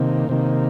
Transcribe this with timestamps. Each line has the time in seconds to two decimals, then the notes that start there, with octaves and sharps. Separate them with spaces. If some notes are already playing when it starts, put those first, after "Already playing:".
Already playing: C3 D#3 A#3
0.29 C3 D#3 A#3